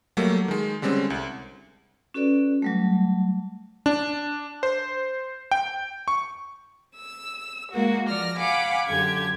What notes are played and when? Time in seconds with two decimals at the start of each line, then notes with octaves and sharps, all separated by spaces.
0.17 F#3 G3 A3 A#3
0.48 D#3 G#3
0.82 D3 G3 G#3 C4 C#4
1.10 C2
2.14 C#4 F#4 A4 B4 D5
2.62 F#3 G3 A3
3.86 D4
4.63 C5
5.51 G5
6.08 C#6
6.96 E6
7.71 G#3 A#3 F#4
8.08 F3 D5 F6 A#6
8.38 F5 F#5 G#5 B5 D6
8.88 F#2 D3 G4 G#6